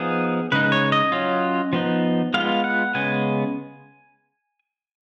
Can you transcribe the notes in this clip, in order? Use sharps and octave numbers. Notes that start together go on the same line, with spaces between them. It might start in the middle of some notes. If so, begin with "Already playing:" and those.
Already playing: F3 B3 D#4 G#4
C#3 G#3 D#4 B4
C#5
D#5
F#3 C#4 F4
F3 B3 D#4
G#3 B3 F4 F5
F#5
C#3 G#3 B3 G#5